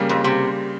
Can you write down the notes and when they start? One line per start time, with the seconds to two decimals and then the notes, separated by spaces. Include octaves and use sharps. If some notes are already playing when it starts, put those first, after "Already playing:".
Already playing: C#3 G3 A#3
0.09 F2
0.24 C3